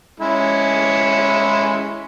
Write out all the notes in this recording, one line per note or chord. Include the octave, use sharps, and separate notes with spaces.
G#3 C#4 E4